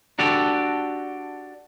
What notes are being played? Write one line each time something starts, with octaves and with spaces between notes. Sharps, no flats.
D4 F#4 G4 A4